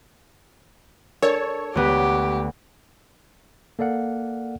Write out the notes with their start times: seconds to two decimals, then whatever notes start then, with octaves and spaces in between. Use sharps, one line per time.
1.22 D4 A4 A#4 C#5 D5
1.75 D2 B3 G4
3.79 A#3 A4 D5 F5 F#5